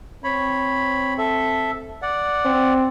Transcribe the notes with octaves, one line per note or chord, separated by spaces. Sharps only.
C4 C#5 B5
A4 E5
D5 F#5
C4